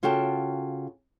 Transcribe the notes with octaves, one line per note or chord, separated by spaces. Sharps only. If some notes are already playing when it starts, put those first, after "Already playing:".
C#3 F4 F#4 A4 G5 A5